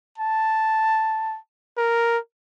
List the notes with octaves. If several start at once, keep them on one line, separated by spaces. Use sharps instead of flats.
A5
A#4